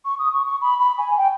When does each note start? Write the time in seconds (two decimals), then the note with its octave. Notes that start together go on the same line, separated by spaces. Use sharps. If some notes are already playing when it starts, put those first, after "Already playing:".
0.05 C#6
0.19 D#6
0.33 C#6
0.46 C#6
0.61 B5
0.80 B5
0.98 G#5
1.17 G5